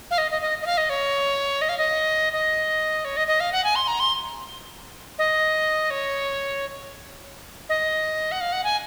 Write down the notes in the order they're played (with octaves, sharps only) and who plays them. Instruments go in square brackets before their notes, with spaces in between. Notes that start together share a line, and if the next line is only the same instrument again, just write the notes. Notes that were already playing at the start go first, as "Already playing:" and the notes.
[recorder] F5
D#5
D#5
D#5
D#5
F5
D#5
C#5
D#5
F5
D#5
D#5
C#5
D#5
D#5
F5
F#5
G#5
C6
A#5
C6
D#5
C#5
D#5
F#5
F5
F#5
G#5